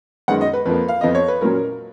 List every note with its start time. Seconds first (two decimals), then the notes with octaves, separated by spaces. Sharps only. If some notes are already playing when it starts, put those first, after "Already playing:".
0.28 F#2 D#3 G#3 B3 F#5
0.41 D#5
0.54 B4
0.66 F2 F3 A#3 B4
0.88 F5
1.01 F2 F3 B3 D#5
1.15 C#5
1.28 B4
1.41 A#2 F#3 C#4 A#4